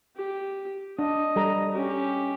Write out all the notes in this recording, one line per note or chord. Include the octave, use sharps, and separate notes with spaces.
G4
D4 D#5
G3 A4 A#5
C#4 G4